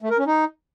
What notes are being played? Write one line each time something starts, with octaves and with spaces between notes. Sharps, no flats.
A3
A#4
C#4
D#4